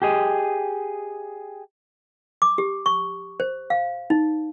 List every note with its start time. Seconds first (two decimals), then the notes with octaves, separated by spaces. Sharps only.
0.02 G4 G#4 D#5
2.42 D6
2.58 G4
2.86 C#6
3.40 C5
3.70 F5
4.10 D#4